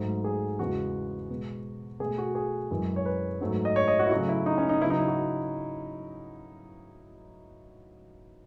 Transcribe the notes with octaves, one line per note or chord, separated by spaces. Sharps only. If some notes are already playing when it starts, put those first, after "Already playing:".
Already playing: G#2 F#3 A3
G#4
E2 C#3 G#3 B3 F#4
B2 G#3 B3
B2 A3 G#4
F#4
G#4
F#2 E3 G#3
C#5
B4
G#2 F#3 A3
D#5
C#5
D#5
F#4
E4
C#3 F#3 A3 F#4
E4
D#4
C#4
D#4
C#3 F#3 B3 E4
D#4
E4
F#4